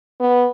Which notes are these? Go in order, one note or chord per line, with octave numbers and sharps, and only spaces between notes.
B3